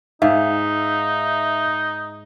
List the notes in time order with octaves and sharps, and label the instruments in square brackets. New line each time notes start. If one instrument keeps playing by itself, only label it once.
[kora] G#2 [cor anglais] D#4 [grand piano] E5 F5